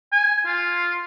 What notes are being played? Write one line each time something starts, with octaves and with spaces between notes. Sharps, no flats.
G#5
F4